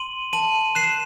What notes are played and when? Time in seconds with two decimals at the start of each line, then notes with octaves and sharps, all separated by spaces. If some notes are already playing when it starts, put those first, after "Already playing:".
Already playing: C6 D#7 F#7
0.33 A5 D#7 F#7
0.75 F#6 C7 E7